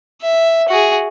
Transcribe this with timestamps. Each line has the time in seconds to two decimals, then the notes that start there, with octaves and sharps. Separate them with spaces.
0.22 E5
0.69 F#4 G#4